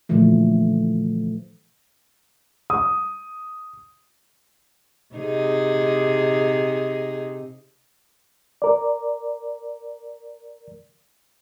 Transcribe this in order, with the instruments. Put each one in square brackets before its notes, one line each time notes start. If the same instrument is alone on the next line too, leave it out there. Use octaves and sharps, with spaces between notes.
[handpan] A#2 D3 E3 F3 A3
[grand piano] D#6
[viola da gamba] C3 D#4 G#4
[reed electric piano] A#4 D5